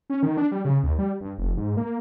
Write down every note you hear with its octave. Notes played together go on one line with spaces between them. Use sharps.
C#4
D#3
D4
G3
C#3
D#2
G3
G2
F1
G#2
A#3